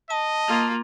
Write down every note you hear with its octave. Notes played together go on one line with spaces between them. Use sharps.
D#5 A5
A#3 F4